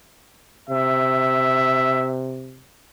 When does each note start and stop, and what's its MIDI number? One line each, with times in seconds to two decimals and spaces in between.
0.70 2.66 48
0.70 2.12 76